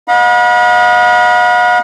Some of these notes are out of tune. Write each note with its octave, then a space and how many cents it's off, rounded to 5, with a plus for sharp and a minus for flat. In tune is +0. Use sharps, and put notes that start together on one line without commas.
D#5 +0 F#5 -45 B5 -35